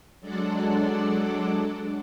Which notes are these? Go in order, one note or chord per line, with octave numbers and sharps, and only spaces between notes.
F#3 G#3 D4 A4 D5 F#5